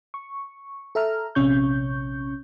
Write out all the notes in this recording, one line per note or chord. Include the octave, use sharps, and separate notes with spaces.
C#6
A4 E5 A#5 F6
A#1 C3 C#4 C#6 G6